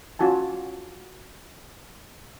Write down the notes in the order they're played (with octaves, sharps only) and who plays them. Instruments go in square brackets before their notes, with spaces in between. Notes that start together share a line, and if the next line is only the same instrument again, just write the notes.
[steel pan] C#4 F4 F#4 G#5 A5